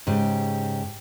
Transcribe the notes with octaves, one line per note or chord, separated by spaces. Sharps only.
G#2 C#3 G4